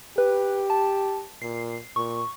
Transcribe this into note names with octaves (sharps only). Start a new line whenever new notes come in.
G4 B4
A5
A#2 C7
A#2 C#6